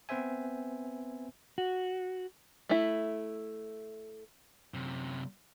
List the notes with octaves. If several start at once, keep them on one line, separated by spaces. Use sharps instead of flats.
B3 C4 B4 C5 E5 G#5
F#4
A3 E4
F#2 C3